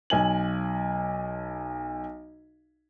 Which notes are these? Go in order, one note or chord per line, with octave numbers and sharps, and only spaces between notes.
B1 G#5 F#7